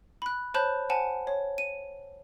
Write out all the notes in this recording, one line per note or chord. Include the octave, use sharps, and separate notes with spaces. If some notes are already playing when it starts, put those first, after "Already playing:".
B5 F#6
C5 C#5 A5 B5 F#6 G6
C5 F#5 G#5 A5
C#5
D#7